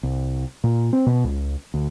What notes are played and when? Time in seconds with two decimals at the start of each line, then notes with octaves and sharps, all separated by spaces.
0.03 C2
0.64 A#2
0.93 C4
1.06 B2
1.24 C#2
1.74 D2